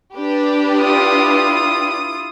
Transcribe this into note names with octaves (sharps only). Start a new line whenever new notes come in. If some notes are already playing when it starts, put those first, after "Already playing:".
D4 G4 B4
E4 F4 D#6